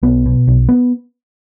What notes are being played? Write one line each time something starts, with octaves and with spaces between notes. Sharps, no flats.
B1 B3
B2
B1
B3